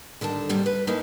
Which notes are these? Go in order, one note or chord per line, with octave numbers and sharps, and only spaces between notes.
D3 D#3 G3 A5
D#2 G#2 C3 G3
B4
A3 A#3 C#4 D#4 E4